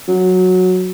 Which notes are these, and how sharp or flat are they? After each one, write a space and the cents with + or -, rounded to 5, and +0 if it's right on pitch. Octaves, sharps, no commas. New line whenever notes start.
F#3 -10